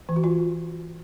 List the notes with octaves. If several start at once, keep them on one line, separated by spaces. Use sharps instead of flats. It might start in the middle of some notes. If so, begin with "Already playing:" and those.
E3
F#4
F4